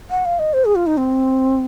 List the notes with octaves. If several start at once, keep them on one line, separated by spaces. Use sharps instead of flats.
F#5
F5
D#5
C5
G#4
F4
D#4
C4